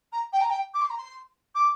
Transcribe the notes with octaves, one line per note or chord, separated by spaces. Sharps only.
A#5
G5
A#5
G5
D6
C6
A#5
C6
D6